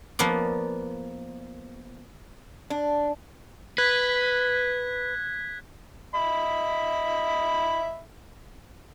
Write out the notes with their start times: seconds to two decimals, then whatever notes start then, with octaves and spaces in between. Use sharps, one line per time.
0.19 F3 A#3 B3 D5
2.70 D4
3.78 B4 F#6 G#6 B6
6.14 D#5 E5 B5